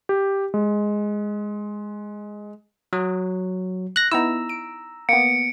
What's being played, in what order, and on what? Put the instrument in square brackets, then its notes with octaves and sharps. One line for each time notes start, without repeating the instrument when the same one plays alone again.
[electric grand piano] G4
G#3
[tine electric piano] F#3 [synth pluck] D#6
[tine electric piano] F#6 A#6
[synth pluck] B3 D#4 E4 [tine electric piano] A#5 E6
[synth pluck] D7
[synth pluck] A#3 B3 [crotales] C#7 D7